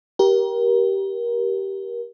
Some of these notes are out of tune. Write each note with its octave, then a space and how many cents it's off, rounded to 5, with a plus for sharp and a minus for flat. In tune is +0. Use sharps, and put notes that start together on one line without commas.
G4 -10 A#4 +25